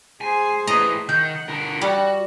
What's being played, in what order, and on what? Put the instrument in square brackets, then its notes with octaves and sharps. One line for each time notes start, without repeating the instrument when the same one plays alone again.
[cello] G#4 C5 [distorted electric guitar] G#5
[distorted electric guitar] A2 B4 [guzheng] D#5 A#5
[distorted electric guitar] D#3 [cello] F#5 [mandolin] G6
[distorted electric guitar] D3 A#4
[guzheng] G3 [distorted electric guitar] F#4